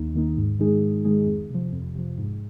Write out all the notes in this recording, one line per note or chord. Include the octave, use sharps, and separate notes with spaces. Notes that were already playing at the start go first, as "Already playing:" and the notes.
Already playing: D#2 D#3 A#3 D#4
D#3 A#3 D#4
G#2
D#3 G#3 D#4 G#4
G#2
D#3 G#3 D#4 G#4
F2
C3 F3
F2
C3 F3
G#2